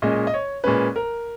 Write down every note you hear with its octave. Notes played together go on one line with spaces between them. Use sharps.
A#2 G#3 C#4 D#5
D#5
C#5
A#2 G#3 C#4 B4
A#4